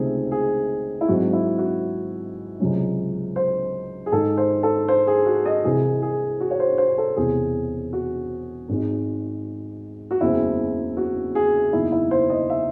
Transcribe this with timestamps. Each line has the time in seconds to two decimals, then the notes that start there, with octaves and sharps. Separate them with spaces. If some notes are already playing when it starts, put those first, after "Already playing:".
Already playing: C#2 C3 D#3 A3 C4 G#4
0.31 G#4
1.01 E4
1.08 G#1 G#2 F#3 C4 F#4
1.33 E4
1.58 F#4
2.60 C#2 C3 F#3 C#4
3.36 C5
4.06 G#4
4.12 G#2 D#3 G#3 A4
4.37 C5
4.63 A4
4.88 C5
5.07 G#4
5.26 F#4
5.46 D#5
5.64 C2 C3 E3 G#4
6.02 G#4
6.40 F#4
6.51 C#5
6.60 C5
6.78 C5
6.98 A4
7.16 E1 E2 C3 E3 G#4
7.93 F#4
8.69 G#1 G#2 D#3 G#3
10.11 F#4
10.21 F#1 E2 C#3 G#3 C4 E4
10.97 F#4
11.35 G#4
11.73 F#1 E2 D#3 E4
11.92 E4
12.11 C5
12.30 D#5
12.50 E5